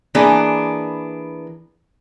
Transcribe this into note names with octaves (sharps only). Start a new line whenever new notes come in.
E3 A#3 B3 D4 G#4